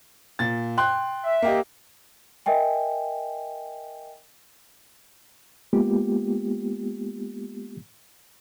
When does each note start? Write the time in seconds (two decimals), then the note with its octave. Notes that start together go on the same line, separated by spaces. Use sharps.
0.39 A#2 A6
0.77 G5 C6 F#6
1.24 E5
1.42 A#3 G4 D#5
2.46 A#4 D#5 E5 G5 G#5
5.73 G#3 A#3 B3 F4 G4